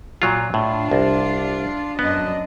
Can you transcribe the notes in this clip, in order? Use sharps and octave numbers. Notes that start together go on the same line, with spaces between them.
A#2 F#3 F4
A2 D4 F4
C2
F#2 B3 D4 D#5